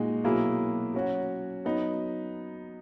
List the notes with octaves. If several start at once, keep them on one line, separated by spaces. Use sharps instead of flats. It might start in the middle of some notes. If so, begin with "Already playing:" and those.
Already playing: A#2 G#3 D#4 F#4
B2 F#3 A#3 E4 G#4
F#3 C#4 F#4
F#3 B3 D#4